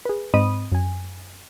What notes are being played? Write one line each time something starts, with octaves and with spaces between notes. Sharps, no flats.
G#4 B4
G#2 C4 D#5 B5 D#6 D#7
F#2 G#5